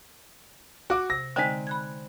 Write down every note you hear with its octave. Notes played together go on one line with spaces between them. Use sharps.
F#4 F#5 D6
C3 A#6
D3 G#3 C4 D#4 G#5
B5 F#6 G#6